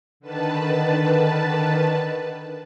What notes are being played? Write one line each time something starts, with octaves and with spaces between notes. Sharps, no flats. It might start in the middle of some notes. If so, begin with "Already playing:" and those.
D3 D#3 B4 A5